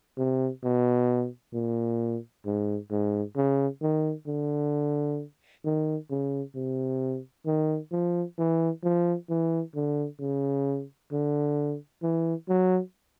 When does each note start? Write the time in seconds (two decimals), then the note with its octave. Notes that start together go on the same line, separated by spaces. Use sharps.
0.18 C3
0.64 B2
1.54 A#2
2.46 G#2
2.91 G#2
3.36 C#3
3.82 D#3
4.27 D3
5.65 D#3
6.10 C#3
6.55 C3
7.46 D#3
7.92 F3
8.39 E3
8.83 F3
9.30 E3
9.75 D3
10.20 C#3
11.12 D3
12.03 E3
12.49 F#3